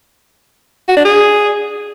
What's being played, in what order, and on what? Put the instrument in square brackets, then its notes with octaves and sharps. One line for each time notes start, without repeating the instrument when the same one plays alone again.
[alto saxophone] F#4
D4
G#4